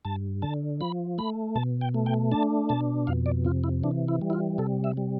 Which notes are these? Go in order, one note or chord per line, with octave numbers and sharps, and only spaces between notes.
G2 A5
D3 A5
F3 B5
A3 B5
B2 A5
G5
A3
G5
D4 A5
B2 A5
F2 F5
D5
C3 F4
E4
E3 D4
E4
G3
E4
F4
C3 A4
E5
G3